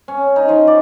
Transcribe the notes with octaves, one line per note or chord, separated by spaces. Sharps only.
C#4
D#4
F3
D5